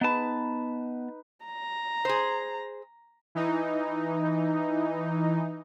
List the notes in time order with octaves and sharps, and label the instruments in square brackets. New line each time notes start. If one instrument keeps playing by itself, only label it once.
[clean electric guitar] B3 A5 [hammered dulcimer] D#4 B4
[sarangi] A#5
[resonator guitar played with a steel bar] G#4 C5
[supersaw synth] E3 D#4